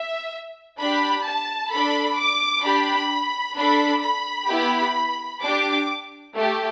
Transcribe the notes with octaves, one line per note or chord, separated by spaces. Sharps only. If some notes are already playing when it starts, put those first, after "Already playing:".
Already playing: E5
D4 G4 B5
A5
D4 A4 B5
D6
D4 G4 B5
D4 A4 B5
B5
B3 E4 G4
D4 G4 D6
A3 G4